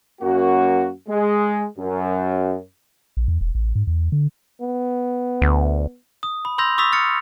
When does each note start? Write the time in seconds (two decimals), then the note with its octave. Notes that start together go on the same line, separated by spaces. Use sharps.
0.21 F#2 A#3 F#4
1.08 G#3
1.77 F#2
3.17 A#1
3.28 E2
3.41 E1
3.55 A1
3.75 G#2
3.87 E2
4.12 D3
4.61 B3
5.42 D2
6.23 D#6
6.45 B5
6.58 B5 C6 E6 G6 A#6 F7
6.78 C#6 D#6 E6 A6 B6 F7
6.92 F6 A6 C#7